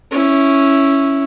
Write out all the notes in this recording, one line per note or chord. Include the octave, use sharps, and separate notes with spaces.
C#4 E4